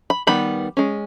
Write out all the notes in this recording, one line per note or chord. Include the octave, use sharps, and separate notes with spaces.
B5
D#3 G3 B3 B5
G#3 C#4